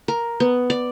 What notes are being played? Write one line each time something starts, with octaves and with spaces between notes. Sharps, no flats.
A#4
B3
D5